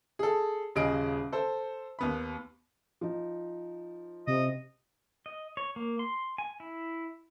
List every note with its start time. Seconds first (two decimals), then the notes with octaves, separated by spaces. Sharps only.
0.19 G#4 A4
0.75 D#1 C#3 G#4 D#5 D7
1.32 A4 C5
1.99 D#2 B3 B5
3.01 F3 D#4
4.27 C3 D#5
5.26 D#5
5.57 C#5
5.76 A#3
5.99 C6
6.38 G#5
6.60 E4